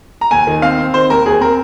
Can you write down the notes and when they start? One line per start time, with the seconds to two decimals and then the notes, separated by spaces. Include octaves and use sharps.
0.21 A#5
0.31 D#2 G#5
0.47 D#3
0.62 C4 F5
0.79 C4
0.94 D#3 C5
1.10 D#2 A#4
1.26 D#2 G#4
1.41 C4 A#4